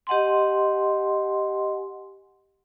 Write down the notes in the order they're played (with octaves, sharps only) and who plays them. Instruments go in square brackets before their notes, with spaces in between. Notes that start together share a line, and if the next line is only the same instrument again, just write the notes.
[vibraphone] G4 D#5 F#5 G#5 C6